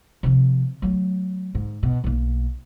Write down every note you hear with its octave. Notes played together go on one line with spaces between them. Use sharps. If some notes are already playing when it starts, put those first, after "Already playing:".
C3 F3
F#3 A3
G#2
B2
B1 A#3